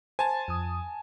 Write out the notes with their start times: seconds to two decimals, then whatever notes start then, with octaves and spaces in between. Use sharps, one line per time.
0.19 C5 G#5 A5 A6
0.48 F2 D#6